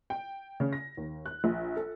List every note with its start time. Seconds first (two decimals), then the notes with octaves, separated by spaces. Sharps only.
0.10 G5
0.60 C#3
0.73 A#6
0.97 D#2
1.26 F#6
1.44 A#1
1.77 A4